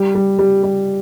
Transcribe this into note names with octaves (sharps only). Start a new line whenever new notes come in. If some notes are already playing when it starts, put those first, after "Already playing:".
Already playing: G3
G3
G3
G3